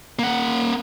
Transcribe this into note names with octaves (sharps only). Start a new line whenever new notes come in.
A#3 F#5